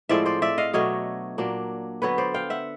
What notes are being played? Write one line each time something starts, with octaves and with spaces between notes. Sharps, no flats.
A2 F3 G#3 C4 D5 E5
C5 D5
D5 E5
D#5 F5
B2 F#3 A3 D4 C#5 D#5
A#2 F#3 A#3 D4
D3 F#3 B3 B4 C#5
C5 D5
F5 G5
E5 F#5